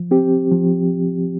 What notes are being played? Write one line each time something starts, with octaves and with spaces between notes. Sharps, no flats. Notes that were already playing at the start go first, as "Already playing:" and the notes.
Already playing: F3
C4 G4
F3